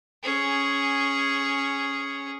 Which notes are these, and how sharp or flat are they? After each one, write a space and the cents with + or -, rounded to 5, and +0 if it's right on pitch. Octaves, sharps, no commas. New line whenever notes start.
C#4 +0 G#4 +0